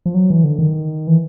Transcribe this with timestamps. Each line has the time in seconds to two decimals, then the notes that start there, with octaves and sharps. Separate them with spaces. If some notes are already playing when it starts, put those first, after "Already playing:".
0.06 F3
0.14 F#3
0.30 E3
0.44 D3
0.59 D#3
1.07 E3